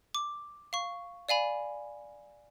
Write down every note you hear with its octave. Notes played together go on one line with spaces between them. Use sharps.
D6
F5 C#6
D5 F5 G#5 B5